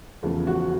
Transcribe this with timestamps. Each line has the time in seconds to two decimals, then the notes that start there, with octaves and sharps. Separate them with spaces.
0.23 E2 C#3 F3 A3
0.47 F#4